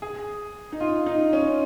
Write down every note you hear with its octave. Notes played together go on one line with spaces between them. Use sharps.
G#4
D#4
F4
D#4
C#4